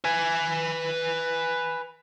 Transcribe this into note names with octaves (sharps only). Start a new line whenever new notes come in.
B4 G#5